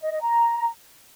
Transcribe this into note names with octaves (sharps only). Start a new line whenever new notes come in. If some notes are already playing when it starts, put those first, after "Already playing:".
D#5
D#5
A#5